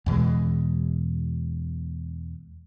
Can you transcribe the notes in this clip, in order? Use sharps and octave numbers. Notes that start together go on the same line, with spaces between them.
E2 B2 E3 G#3